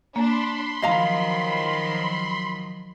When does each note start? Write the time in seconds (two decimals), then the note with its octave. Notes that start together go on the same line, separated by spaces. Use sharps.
0.16 A#3 D4 B5 C6
0.82 D#3 F3 F#3 D#5 F5 A#5